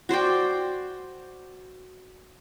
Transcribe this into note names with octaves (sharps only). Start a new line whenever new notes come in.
F#4 C5 D5 G5